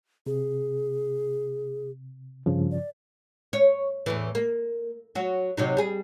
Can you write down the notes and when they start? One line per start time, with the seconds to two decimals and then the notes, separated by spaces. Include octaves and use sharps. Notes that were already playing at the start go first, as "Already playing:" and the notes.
0.26 C3 G#4
2.46 G2 C#3 F3
2.71 D5
3.53 C#5
4.06 E2 A2 E3
4.35 A#3
5.15 F#3 F#4
5.57 C3 F#3 D#4
5.77 G3 G#4